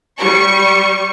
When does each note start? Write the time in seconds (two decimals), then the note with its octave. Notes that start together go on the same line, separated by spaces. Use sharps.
0.19 G3 C#6